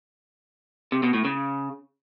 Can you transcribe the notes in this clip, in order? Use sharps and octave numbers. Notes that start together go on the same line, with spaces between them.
C3
B2
A2
C#3